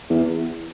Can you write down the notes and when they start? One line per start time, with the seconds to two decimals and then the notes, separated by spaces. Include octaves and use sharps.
0.10 E2